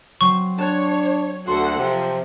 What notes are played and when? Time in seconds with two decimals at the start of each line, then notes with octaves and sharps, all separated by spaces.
0.21 F#3 C4 C#6
0.58 D4 C#5 A5 F#6
1.47 D2 F#4 A4 F#5 C6
1.78 C3 F3